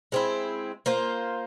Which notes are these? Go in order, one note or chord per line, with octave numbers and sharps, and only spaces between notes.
G#3 C4 E4
A#3 F4 C5